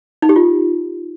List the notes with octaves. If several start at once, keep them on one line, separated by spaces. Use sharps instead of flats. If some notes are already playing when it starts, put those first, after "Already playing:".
D#4
G4
F4